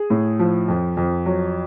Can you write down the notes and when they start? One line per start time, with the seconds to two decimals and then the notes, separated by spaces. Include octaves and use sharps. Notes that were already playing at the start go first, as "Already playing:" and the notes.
Already playing: G#4
0.10 A2
0.39 F3
0.68 F2
0.97 F2
1.26 F#3